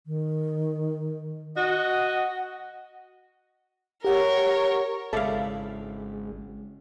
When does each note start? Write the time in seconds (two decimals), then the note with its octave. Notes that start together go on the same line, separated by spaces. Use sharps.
0.06 D#3
1.57 F#4 D#5 F#5
4.04 G4 A#4 C#5 F#5
5.13 G#1 C#3 G#3 E4 A4 D5 F5